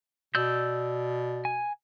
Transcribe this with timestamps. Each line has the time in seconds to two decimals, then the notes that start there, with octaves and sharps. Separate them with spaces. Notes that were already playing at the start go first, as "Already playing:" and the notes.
0.35 B2 D5 E6 G6
1.45 G#5